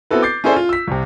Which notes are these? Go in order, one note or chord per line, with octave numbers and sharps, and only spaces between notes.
B3 C4 E4 F#4 A4 B4
D6 G6 A6 C7
C#4 E4 G#4 A4 C5 D5
F4
E6 B6
C2 C3